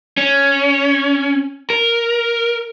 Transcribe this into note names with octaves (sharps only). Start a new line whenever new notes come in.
C#4
A#4